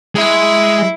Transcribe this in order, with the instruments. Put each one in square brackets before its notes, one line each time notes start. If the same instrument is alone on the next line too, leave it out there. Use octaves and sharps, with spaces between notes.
[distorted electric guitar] G#3 G#4 [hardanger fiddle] E4